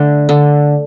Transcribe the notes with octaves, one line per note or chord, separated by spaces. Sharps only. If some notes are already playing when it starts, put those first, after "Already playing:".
Already playing: D3 A3
D3